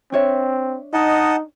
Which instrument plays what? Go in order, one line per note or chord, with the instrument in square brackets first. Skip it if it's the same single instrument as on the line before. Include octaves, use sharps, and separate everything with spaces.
[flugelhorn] C4 [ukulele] D4 C#5 E5
[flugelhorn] D#4 [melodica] D#5 F#5 A5